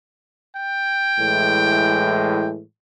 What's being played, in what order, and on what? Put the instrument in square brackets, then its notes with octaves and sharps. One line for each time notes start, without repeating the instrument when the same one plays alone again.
[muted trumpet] G5
[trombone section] A2 E3 G#3